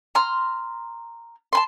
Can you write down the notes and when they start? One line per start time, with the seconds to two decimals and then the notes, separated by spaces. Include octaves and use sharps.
0.15 A#5 C6 F6
1.53 A5 B5 C6